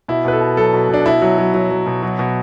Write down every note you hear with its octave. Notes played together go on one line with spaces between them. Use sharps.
B2 E4
B2 B4
A4
B2
F#3 A4
B2
B2 D4
B2 E4
F#3
F#3
F#3
F#3
B2
F#3
B2